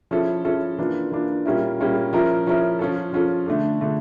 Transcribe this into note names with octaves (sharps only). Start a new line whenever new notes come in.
F3 C#4 E4 A4
F3 C#4 E4 A4
E3 A#3 D4 F4
E3 A#3 D4 F4
A#2 G3 A#3 C#4 E4
A#2 G3 A#3 C#4 E4
F3 C#4 E4 A#4
F3 C#4 E4 A#4
F3 C#4 F4 A4
F3 C#4 F4 A4
D3 A3 D4 A4
D3 A3 D4 A4